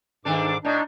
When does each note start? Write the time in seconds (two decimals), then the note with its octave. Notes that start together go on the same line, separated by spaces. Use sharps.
0.25 G#2 D#3 D4 A4 D6
0.65 A2 D4 D#4